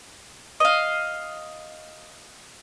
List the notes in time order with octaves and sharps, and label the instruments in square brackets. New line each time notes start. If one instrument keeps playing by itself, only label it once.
[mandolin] D#5 F5